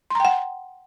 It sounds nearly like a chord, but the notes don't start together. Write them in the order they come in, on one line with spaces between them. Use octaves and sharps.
C6 A#5 G5 F#5